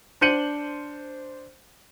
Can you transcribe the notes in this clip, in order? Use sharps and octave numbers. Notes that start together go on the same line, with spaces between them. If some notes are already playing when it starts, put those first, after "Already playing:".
D4 C5 G6 C#7 D#7 F#7